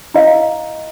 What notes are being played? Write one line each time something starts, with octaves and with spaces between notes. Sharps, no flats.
E4 D#5 F5